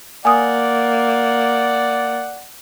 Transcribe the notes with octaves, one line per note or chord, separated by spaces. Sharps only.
A#3 D5 F#5 G#5 D#6